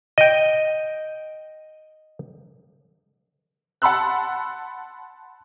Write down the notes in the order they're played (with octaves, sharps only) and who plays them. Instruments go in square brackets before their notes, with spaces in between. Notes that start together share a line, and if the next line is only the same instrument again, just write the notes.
[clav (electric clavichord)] D#5 G5
[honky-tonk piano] F#5 A5 B5 C6 E6 F#6